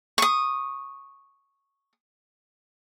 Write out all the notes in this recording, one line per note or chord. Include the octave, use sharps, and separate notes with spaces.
C#6 D#6